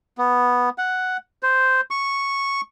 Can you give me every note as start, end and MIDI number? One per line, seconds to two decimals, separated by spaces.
0.18 0.69 59
0.78 1.17 78
1.43 1.81 72
1.91 2.61 85